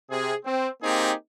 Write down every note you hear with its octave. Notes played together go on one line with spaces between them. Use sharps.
C3 G#4
C4
A#3 C4 D#4 G4 G#4